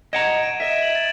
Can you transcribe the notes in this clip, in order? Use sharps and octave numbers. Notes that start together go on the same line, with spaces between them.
D#5 F#5 A#5 G#6 D7 E7
D7 D#7
D#5 E5 D7 E7
D7 F#7
A6